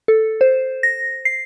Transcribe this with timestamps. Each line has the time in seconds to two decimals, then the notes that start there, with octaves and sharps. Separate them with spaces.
0.08 A4
0.41 C5
0.83 A#6
1.25 C7